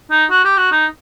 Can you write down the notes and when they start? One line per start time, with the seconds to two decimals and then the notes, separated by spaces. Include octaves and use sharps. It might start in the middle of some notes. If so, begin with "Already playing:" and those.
0.11 D#4
0.31 F#4
0.45 G4
0.57 F#4
0.72 D#4